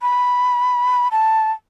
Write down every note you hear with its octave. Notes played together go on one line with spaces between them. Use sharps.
B5
A5